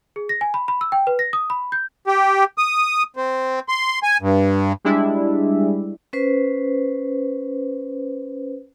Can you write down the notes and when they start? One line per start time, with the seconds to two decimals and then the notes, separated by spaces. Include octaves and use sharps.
0.16 G#4
0.29 A#6
0.41 G#5
0.54 B5
0.68 B5
0.81 E6
0.92 G5
1.07 B4
1.19 A#6
1.33 D#6
1.50 B5
1.72 G6
2.07 G4
2.58 D#6
3.16 C4
3.69 C6
4.03 G#5
4.22 G2
4.84 G3 G#3 D4 E4
6.13 C#4 B4 C5